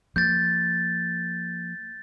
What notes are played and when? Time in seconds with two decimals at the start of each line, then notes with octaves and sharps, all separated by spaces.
0.16 F3 A#3 G6 A6